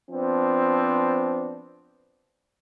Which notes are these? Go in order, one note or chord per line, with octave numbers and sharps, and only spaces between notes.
F3 B3 C4 D4